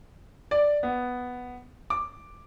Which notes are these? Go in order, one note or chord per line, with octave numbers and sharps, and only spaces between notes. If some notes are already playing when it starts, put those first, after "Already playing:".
D5
B3
D6